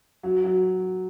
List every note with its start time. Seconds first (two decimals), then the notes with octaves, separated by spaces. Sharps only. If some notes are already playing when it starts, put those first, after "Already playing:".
0.23 F#3
0.44 F#3